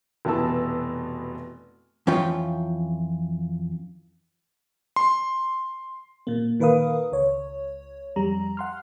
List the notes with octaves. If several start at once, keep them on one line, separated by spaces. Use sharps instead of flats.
F1 B2 E3 B3 A5 E6
F2 E3 C#4 F4 G5
C6
A#2 A#3
A#2 D#3 A#4 B4 F5 D#6
C#2 C#5
F2 G3 A#5
F#5 C6 F6